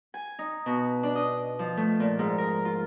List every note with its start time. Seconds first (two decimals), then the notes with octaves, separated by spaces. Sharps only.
0.14 G#5
0.39 D#4
0.66 B2
1.03 D4
1.15 D#5
1.59 F3
1.77 A3
2.00 A#2
2.19 G#2
2.38 A#4
2.65 F4